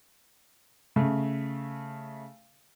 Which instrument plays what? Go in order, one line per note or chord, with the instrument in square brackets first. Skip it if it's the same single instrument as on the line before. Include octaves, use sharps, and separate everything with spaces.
[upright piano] C#3 A3